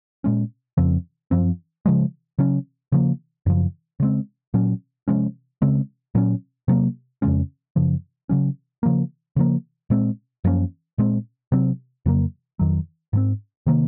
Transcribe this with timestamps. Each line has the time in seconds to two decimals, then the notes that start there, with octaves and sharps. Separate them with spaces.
0.24 A#2 G#3 C#4
0.77 F2 C#3 F3 C4
1.31 F#2 F3 C4
1.86 C#3 F3 G#3
2.38 C#3 F#3 C#4
2.92 C#3 F3 A#3
3.46 F#2 C#3 F3
4.00 C#3 G#3 C4
4.54 A#2 F#3 C#4
5.08 C3 F3 G#3 C#4
5.62 C#3 G#3 C4
6.15 A#2 F#3 C#4
6.68 C3 F#3 A#3
7.22 F2 C#3 G#3 C#4
7.76 F#2 C#3 F3
8.29 C#3 F#3 C#4
8.83 C#3 F3 A#3
9.36 C#3 F3 A#3
9.90 A#2 G#3 C4
10.44 F#2 F3 A#3 C#4
10.98 A#2 G#3 C4
11.52 C3 F#3 C4
12.06 F2 C#3 F#3 A#3
12.59 F2 D#3 F#3
13.13 G#2 F3 C4
13.66 C3 D#3 A#3